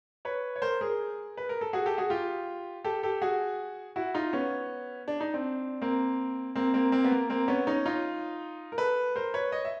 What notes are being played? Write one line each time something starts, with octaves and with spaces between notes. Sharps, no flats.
B4 C#5
C#5
A#4 C5
G#4 A#4
B4
A#4
A4
F#4 G#4
G4 A4
F#4 G#4
F4 G4
G4 A4
G4 A4
F#4 G#4
E4 F#4
D#4 F4
B3 C#4
D4
D#4
C4 D4
A#3 C4
A#3 C4
A#3 C4
A#3 C4
B3
A#3
A#3 C4
B3 C#4
C#4 D#4
D#4 F4
A#4
A4 B4
A#4 C5
B4 C#5
C#5 D#5
E5